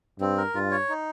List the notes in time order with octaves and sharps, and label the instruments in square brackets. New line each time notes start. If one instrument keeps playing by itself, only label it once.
[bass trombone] G2 [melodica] C4
[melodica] A#4
[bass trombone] G2 [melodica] F4
[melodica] C#5
D#4